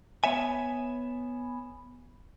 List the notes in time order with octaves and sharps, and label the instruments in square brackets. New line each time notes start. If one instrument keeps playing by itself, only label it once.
[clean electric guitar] B3 C#5 E5 G#5